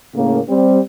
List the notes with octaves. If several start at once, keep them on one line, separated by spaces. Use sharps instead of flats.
A2 C#3 A#3
G3 C4